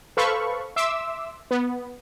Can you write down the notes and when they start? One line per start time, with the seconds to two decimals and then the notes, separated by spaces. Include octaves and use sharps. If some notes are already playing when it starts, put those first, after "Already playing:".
0.17 A4 B4 C5 F5 B5 C#6
0.76 E5 C6 D6 E6
1.51 B3